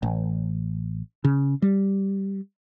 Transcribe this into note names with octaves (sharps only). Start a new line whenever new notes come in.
A1
C#3
G3